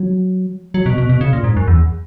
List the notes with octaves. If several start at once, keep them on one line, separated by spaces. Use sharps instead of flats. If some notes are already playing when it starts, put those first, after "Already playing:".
Already playing: F#3
F#3
B2
B2
B2
C#3
A#2
G#2
F#2
E2